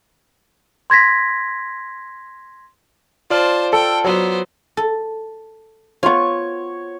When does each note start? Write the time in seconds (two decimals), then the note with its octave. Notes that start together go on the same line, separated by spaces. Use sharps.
0.90 C6 G#6 A#6 B6
3.30 F4 C5 D5 A5 F6
3.73 A4 G5
4.05 F#3 B3 C5
4.77 A4
6.03 B3 F4 C#5 C#6